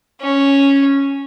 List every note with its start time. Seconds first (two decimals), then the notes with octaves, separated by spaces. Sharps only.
0.21 C#4